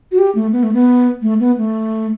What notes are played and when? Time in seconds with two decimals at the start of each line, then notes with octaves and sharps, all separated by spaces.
0.12 F#4
0.18 G4
0.35 A3
0.52 B3
0.63 A3
0.73 B3
1.22 A3
1.40 B3
1.58 A3